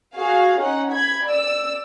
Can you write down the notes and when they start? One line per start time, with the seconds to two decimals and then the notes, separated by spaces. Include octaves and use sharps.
0.16 F#4 G#4 F5
0.59 C#4 D#4 F#5
0.90 B5 G#6
1.27 D5 E6